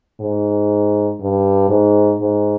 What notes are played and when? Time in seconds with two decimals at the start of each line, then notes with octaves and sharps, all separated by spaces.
0.20 G#2
1.20 G2
1.69 G#2
2.20 G#2